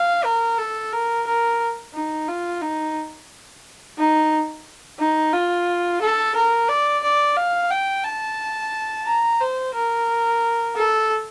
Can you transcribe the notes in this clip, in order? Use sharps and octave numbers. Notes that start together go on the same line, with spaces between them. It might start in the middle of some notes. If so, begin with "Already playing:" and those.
Already playing: F5
A#4
A4
A#4
A#4
D#4
F4
D#4
D#4
D#4
F4
A4
A#4
D5
D5
F5
G5
A5
A#5
C5
A#4
A4